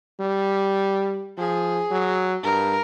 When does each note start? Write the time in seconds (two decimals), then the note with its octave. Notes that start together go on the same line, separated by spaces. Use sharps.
0.20 G3
1.38 F3 G#4
1.91 F#3
2.44 G2 A#4